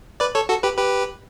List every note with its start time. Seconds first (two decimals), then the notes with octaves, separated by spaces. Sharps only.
0.20 B4 D5
0.35 A4 C#5
0.49 F#4 A4
0.63 G4 B4
0.77 G4 B4